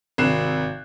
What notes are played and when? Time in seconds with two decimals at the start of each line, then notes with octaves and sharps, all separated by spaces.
0.18 G#1 C3 F#6 C7 E7